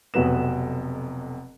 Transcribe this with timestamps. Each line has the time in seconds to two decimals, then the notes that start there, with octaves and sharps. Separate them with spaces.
0.14 F1 F2 B2 F#3 B4 E7